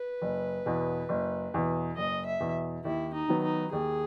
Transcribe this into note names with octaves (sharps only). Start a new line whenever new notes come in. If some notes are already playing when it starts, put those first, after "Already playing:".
Already playing: B4
F#1
E2 B2
F#1
E2 B2
F#1 D#5
E5
E2 B2
D#2 E4
D#4
D#3 F#3 B3
D#4
D#2 G#4